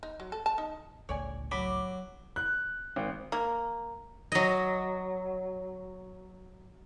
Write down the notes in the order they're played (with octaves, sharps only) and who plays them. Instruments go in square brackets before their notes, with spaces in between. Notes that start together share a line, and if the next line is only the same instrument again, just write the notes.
[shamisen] D#4
F#3
A4
A5
D#4
[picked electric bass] G1 C#2 A2 [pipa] C#5 D5 G#5
[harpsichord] F#3 [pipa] B5 [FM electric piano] D6
[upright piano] F#6
G#1
[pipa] A#3
[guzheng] F#3 D#5